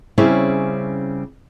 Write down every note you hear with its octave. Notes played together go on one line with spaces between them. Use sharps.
C#3 G3 C4 C#4 E4 G#4